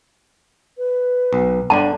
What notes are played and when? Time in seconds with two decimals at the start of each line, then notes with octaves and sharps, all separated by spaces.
0.78 B4
1.33 B1
1.70 G1 D3 D4 F#5 A5